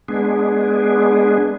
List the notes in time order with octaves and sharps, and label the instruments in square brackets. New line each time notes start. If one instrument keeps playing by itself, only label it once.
[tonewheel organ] G#3 B3 D4 G#4